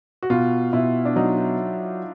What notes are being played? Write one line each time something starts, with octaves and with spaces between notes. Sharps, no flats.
F#4
B2 F4
B2 E4
D4
F#3 D#4
D#4